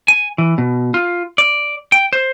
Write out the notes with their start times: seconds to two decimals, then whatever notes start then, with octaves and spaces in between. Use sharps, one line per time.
0.08 G#5
0.38 E3
0.58 B2
0.94 F4
1.38 D5
1.92 G5
2.13 C5